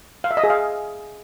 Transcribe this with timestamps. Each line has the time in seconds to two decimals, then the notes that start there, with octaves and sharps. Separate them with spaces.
0.24 F5
0.31 E5
0.37 D#5
0.44 G#4
0.50 F5